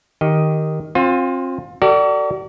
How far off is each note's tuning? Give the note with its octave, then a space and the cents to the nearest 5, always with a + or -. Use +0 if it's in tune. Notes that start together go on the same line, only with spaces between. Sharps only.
D#3 +0 G4 +0 D#5 +0
C4 +25 F4 +30 C5 +0
F#4 +45 A4 +45 D5 +0